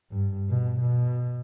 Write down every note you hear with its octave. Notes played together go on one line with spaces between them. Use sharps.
G2
B2
B2